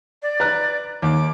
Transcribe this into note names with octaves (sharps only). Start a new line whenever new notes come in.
D5
B4 A#5 F#6
D#2 D6